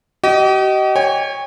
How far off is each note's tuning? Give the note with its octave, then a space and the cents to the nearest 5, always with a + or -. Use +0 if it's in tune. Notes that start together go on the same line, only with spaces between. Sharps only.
G4 -45 D#5 +0
C#5 +0 G5 +45